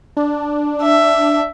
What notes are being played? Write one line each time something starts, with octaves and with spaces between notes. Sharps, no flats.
D4
E5